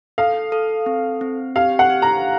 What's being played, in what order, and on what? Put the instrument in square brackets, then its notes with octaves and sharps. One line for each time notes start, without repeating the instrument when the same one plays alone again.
[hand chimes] A4 [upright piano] F5
[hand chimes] A4
C4
C4
[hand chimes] G4 [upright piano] F5
[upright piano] F#5
[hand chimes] G4
[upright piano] A#5